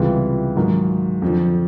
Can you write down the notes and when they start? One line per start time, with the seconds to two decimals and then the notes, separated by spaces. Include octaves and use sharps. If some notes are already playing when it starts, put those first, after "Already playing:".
Already playing: C#2 C3 E3 G3 F4
0.56 G#2 D#3 F#3
1.22 F2 D3 F3